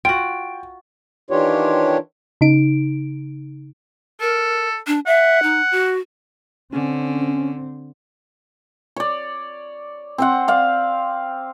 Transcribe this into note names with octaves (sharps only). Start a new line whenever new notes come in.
F4 F#4 G5 D7
D#3 E3 D4 F4 G4 C#5
C#3 D#4 D7
A4 A#4
D4
E5 F#5
D#4
F#4
D3 C4 C#4
C#5 D5
C4 C5 F#5
D5 F5